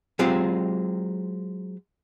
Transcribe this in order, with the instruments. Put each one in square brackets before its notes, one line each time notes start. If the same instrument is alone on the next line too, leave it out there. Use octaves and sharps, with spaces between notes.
[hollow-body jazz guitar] F#3 G#3 C4 F4 G4